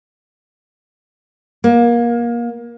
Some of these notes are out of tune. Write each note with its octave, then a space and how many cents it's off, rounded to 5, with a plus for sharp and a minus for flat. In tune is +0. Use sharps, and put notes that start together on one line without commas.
A#3 +25